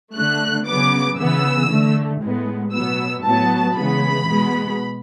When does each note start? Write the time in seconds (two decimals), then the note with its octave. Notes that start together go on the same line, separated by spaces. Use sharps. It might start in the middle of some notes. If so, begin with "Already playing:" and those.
0.15 D3 A3 F#6
0.67 C#3 F#3 B3 D6
1.18 C#3 E3 B3 E6
1.69 D3 A3
2.21 A2 G#3 B3
2.72 B2 F#3 B3 E6
3.24 A2 F#3 B3 A5
3.75 C#3 E3 G#3 B3 B5
4.27 B2 G#3 B3